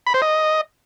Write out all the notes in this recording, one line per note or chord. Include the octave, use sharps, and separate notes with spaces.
B5
C5
D#5